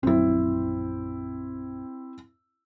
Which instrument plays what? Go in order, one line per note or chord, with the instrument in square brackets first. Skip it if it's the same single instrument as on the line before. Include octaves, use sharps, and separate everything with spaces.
[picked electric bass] A#1 F#2 F#3 [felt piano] C4 E4